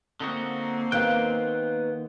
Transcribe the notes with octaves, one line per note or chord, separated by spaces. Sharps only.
D3 A#3 C4 D#4 F#4
D#2 G#2 D#3 B3 F5 G5 F#6